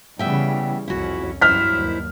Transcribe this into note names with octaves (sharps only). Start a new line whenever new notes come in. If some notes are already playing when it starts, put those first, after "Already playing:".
C#3 E3 G3 B3 E5 G5
C2 F2 C#4 E4 F#4
E2 G2 F#3 E4 C5 F6 B6
D#2